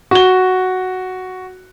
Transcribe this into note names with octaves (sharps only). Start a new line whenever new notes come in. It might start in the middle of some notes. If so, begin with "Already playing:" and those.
F#4 G7